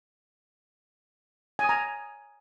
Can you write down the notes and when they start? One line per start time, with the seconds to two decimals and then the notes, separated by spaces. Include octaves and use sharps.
1.59 G#5
1.64 D#6
1.69 A#5